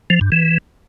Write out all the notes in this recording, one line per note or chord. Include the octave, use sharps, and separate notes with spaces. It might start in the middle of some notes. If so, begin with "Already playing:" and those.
F3
G2
E3